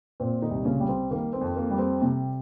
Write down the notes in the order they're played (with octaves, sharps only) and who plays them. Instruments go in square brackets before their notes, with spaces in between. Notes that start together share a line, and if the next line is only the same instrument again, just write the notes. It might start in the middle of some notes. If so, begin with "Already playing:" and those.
[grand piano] A#2 C4 C5
D#3 D#4
C2
C#3 C#4
G3
C4
D#3 A#3
C4
F2
A#3
G3
C4
C3